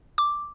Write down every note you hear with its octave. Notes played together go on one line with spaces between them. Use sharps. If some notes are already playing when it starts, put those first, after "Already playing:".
D6